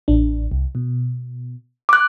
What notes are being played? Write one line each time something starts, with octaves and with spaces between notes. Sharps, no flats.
A1 D4
C2
B2
D6 F#6